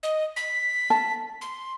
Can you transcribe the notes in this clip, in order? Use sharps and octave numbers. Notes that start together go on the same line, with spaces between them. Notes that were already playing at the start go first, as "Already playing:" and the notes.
D#5
B6
A5
C6